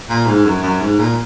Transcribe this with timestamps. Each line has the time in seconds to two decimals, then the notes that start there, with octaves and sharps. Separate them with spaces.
0.09 A#2
0.26 G#2
0.45 F#2
0.63 F#2
0.81 G#2
0.99 A#2